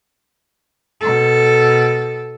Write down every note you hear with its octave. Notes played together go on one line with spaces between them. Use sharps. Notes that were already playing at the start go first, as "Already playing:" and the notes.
B2 A4